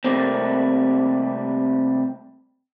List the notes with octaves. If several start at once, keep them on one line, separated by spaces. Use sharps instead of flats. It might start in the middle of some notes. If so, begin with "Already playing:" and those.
C3 E3 G3 A3 A#3 C4